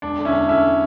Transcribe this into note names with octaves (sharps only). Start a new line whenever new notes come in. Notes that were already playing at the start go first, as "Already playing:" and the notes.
E1 D4
D3
C#4 E4
E2
A3 C#4 E4